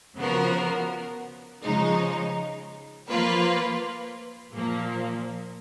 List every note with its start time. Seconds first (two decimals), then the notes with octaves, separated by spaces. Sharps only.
0.18 C#3 F3 B3 F#4 A#4
1.63 C#3 F3 G#3 D#4
3.09 F3 A#3 F4 B4
4.53 A#2 F3 A#3